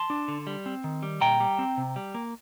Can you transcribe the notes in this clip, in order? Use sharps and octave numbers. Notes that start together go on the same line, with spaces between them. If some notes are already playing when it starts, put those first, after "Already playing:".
Already playing: A5 C6
D4
D3
G3
C4
D#3
G3
A#2 G5 A#5
G3
C4
C3
G3
A#3